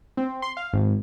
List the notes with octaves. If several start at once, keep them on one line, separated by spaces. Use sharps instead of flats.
C4
C6
F5
G#1